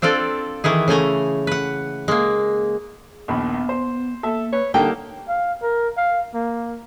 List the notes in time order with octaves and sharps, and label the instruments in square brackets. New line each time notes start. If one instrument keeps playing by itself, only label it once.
[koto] C4 D4 F4 A4 D5
D#3 E3 E4 G#4
C#3 A3 G#5 A#5
B4 F#5
G#3 A#3
[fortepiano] A#1 D#2 B5 [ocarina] B3
[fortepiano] C5
[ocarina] A#3 [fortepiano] A4 E5
[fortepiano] B4 [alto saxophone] C#5
[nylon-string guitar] D3 G5 [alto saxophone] G3 [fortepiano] A#3 D#4 A4 [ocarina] D4
[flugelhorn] F5
A#4
F5
A#3